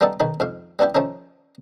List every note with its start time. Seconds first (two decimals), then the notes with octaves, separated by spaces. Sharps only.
0.01 G3 A3 B3 D#4 A4
0.20 B1 D#3 D#4 B5
0.40 F2 G#2 F5
0.79 G3 B3 D4 E4 G4
0.95 F3 A3 C#4 D#4